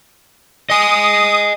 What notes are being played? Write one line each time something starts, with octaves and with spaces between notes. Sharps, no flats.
D#5 G#5 D#6